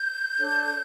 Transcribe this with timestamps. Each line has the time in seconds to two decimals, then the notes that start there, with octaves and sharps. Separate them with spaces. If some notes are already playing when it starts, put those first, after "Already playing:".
Already playing: G6
0.38 D4 A4 C#5